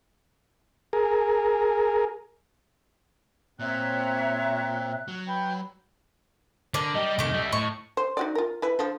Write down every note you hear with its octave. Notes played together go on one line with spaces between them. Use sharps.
G#4 A#4
A#2 C4 C#5 E5 A#5 F#6
F#3
B4 G5
D3 A#4 D5
G3 G4 D#5
C2 D#3 A3 D6
G3 E5
A2 C#6
C5
D#4 F#4 D5
F4 A#4
E4 B4
D3 F3 A4